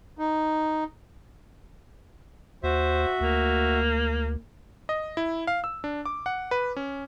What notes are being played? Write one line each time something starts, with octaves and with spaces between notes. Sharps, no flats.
D#4
D#2 F#4 C5 E5
D2 A#3
D#5
E4
F5
E6
D4
D6
F#5
B4
C#4